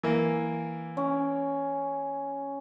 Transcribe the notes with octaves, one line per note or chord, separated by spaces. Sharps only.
E3 A#3
C#4